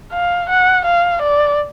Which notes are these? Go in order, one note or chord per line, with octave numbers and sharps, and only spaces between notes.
F5
F#5
F5
D5